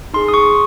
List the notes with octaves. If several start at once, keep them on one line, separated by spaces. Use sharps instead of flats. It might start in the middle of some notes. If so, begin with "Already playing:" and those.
D#4 G#4 C6
D#6
C#6